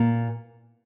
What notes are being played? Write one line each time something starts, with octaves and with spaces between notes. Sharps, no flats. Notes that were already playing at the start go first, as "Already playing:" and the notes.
Already playing: A#2